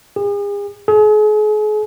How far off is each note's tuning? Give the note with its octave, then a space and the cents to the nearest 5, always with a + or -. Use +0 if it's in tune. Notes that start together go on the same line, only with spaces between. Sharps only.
G#4 -40
G#4 +40